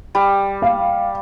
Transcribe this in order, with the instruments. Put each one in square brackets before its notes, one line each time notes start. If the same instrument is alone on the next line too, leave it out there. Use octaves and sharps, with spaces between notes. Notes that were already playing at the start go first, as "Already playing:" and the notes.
[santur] G3
[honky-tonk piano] F5